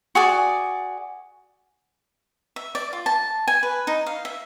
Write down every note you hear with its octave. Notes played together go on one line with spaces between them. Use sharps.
F#4 G#4 D5
E5
D5
F4
A5
G#5
B4
D#4
F5
E5